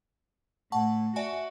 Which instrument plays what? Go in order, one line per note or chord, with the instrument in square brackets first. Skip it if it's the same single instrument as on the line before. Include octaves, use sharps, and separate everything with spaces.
[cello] A2 [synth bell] F#5 A5 C#6
[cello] F#4 [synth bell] D5 E5 G#5